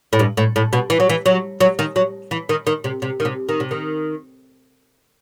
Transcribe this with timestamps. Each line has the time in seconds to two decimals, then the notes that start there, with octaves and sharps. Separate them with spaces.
0.13 A2
0.19 G2
0.37 A2
0.56 A2
0.73 B2
0.90 E3
1.00 F#3
1.09 E3
1.26 F#3
1.61 F#3
1.79 D#3
1.96 F#3
2.31 E3
2.49 D#3
2.67 D#3
2.84 C3
3.02 C3
3.20 D#3
3.25 C3
3.49 D#3
3.60 C3
3.71 D#3